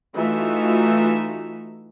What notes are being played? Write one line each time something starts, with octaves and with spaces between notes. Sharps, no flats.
E3 A3 D#4 F4 F#4 E5